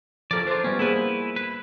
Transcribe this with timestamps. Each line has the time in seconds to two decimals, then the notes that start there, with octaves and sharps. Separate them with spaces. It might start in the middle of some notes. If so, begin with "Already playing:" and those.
0.31 F3 C#4 A4 A#4 D5
0.47 D4 F4 A4 C5
0.64 G3 B3 C#4
0.79 A#3 E4 G#4 B4 C5
1.36 B4